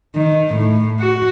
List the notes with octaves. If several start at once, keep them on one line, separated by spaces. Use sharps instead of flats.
D#3
A2
F#4